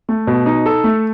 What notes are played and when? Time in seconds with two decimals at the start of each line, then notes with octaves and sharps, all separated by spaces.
0.09 A3
0.27 B2
0.46 D#4
0.66 A4
0.84 A3